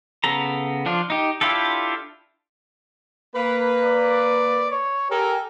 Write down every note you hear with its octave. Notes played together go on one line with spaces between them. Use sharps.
C#3 B3 A4 A#5
F3 D4 F4
D#4 G4
D4 E4 F4 G4 A4
A#3 B4
D5
C#5
G4 A4 A#4 G#5